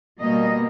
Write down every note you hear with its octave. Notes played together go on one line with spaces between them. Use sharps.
B2 G3 A#3 D#5